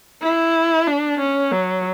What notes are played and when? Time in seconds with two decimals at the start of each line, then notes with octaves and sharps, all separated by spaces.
0.23 E4
0.88 D4
1.20 C#4
1.52 F#3